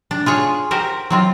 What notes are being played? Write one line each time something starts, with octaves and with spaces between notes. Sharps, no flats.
D4
F4 G#4 C#5
F#4 G4 A#4 C5
F#3 C4 F4